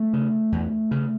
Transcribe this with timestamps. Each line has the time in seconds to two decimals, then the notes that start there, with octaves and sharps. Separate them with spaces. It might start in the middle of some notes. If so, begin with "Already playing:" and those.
Already playing: A3
0.13 C#3
0.52 E2
0.91 C#3